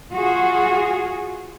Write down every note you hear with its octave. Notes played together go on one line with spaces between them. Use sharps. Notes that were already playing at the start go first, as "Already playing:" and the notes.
F4 F#4 G#4